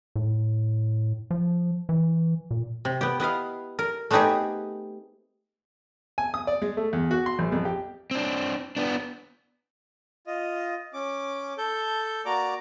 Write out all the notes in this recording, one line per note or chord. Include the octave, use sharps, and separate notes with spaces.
A2
F3
E3
A#2
C3
B3 G4
B3 E4 D#5 F5
A#4
A3 B3 C4 D#4 G4 G#4
G#5
D#6
D5
G#3
A3
E2
F#4
C6
A#1
F2
G4
C4 D4
B3 D4
F4 D#5
C#4 D6
A4 G6
A#3 F#4 D5 A#5 D6